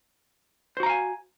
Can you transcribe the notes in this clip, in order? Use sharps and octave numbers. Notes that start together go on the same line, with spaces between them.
F#4 C5 F5 G#5 A#5